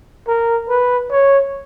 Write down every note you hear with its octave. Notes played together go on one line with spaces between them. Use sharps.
A#4
B4
C#5